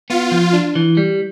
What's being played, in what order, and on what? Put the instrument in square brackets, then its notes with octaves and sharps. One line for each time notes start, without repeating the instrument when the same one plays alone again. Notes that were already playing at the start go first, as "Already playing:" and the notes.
[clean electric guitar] B3 [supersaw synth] F4
[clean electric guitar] F3
D4
E3
G3